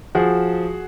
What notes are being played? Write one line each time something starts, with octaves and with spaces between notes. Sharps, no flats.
F3 F#4 G#4